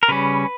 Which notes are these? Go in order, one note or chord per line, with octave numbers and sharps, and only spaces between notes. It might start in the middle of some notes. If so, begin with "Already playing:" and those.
A#4
C#3 G3 C#4 B4